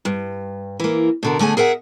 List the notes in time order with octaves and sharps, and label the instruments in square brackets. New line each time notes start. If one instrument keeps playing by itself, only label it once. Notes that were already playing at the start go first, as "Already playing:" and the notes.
[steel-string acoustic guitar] G2
E3 A#3
B2 D3 A#4
D3 A3 G#4 G#5
G#4 A#4 E5 F#5